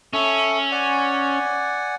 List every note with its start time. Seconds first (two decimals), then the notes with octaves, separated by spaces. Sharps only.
0.13 C#4 A4 E5
0.72 D5 F#5 G#5